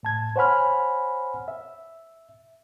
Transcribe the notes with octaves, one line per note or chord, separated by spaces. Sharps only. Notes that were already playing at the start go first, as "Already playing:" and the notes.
A2 A5 G#6
C5 C#5 F#5 G#5 B5 F6
E5